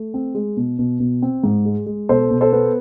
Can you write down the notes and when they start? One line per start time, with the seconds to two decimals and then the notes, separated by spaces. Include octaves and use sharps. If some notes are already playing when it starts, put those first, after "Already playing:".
Already playing: A3
0.14 C4
0.35 G#3
0.57 B2
0.79 B2
1.00 B2
1.22 C4
1.44 G#2
1.65 G#3
1.86 G#3
2.09 B2 A4 C5
2.31 B2
2.41 A4 C5
2.53 B3